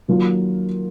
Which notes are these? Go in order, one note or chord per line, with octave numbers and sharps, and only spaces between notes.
D#3 F#3 A#3 F4 A#4